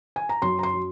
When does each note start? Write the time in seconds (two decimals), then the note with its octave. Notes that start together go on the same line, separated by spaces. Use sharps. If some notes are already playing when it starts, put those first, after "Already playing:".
0.16 G#5
0.29 A#5
0.42 F#2 C6
0.59 A#5
0.63 C6
0.74 F#3